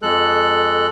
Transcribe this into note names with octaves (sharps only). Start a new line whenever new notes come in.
F2 G#3 A4 F#6